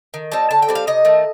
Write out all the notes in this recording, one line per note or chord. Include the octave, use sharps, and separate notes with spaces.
D#3
G3 C4 D#4 A5
D3 A5
G5
G3 C4
F5
C3 D#5
D#3 A3